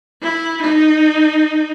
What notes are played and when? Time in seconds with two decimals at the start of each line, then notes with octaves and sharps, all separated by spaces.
0.21 E4
0.62 D#4